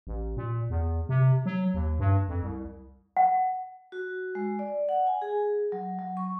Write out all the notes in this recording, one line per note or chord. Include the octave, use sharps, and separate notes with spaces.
A1
A#2
E2
C3
F#3
D#2
G2
F2
C2
F#5
F#4
G#3
D5
F#5
G#5
G#4
F#3
F#3
C#6